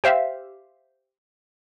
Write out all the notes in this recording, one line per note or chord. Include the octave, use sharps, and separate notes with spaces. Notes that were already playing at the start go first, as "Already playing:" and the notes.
G4 C5 E5 F5